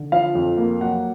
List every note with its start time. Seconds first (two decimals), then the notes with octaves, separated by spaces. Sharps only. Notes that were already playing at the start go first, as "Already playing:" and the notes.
Already playing: D3
0.12 F3 F5
0.35 F2
0.57 A#3
0.80 F#3 F#5